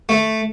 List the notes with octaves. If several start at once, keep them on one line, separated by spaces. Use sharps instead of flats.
A3